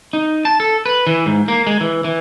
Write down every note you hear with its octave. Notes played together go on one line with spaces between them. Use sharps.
D#4
A5
A4
B4
E3
G#2
A#3
G#3
E3
E3